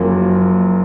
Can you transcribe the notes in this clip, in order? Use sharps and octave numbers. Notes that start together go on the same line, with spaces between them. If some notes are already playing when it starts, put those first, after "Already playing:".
Already playing: F#1 F#2 F3 A#3 F4